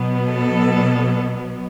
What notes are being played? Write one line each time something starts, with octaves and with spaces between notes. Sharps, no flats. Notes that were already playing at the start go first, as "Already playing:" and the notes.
Already playing: B2 F#3 B3
A4